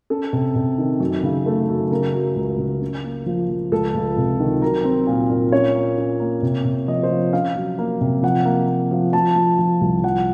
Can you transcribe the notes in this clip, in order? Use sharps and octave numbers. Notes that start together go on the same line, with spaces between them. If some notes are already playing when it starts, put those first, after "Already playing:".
C#4 A4
C3
C3
D#3
F#2
C#3
A3
F#2
C#3 A#4
F#3
C#2
C#3
C#4
A#3
F3
F3
C#2 A4
C#2
C3
D#3
F#3 A#4
C4
A#2
A#2
C#4 C#5
A#3
C#4
A#3
C3
C3
F3 D#5
C5
F3
C#4 F5
F#3
A#3
C3
F3 F#5
A#3
A#3
F3
F3 A5
F3
F3
C2
F3 F#5